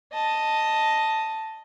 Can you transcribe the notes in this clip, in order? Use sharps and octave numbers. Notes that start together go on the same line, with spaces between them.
D#5 A5